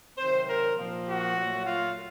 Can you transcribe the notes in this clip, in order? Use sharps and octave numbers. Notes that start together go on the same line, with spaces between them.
C3 D#3 F#3 C4 C5
A#4
A#2 F3 C4
F#4
A#2 F#3 A3
F4